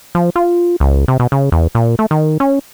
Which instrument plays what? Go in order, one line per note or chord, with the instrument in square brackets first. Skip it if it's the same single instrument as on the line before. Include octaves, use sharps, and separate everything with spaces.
[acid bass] F3
F4
C#2
C3
B2
C#3
E2
A#2
A3
D#3
C#4